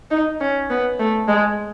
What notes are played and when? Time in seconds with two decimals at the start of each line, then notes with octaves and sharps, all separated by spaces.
0.11 D#4
0.41 C#4
0.70 B3
1.00 A3
1.28 G#3